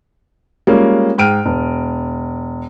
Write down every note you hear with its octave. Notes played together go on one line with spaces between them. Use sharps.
G3 G#3 A#3 C#4 F4
G#2 G5 F6 D7 D#7
E1